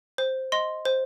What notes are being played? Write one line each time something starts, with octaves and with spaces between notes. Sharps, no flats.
C5
D#5 C6
C5